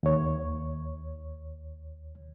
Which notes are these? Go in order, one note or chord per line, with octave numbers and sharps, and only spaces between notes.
D#2 C#5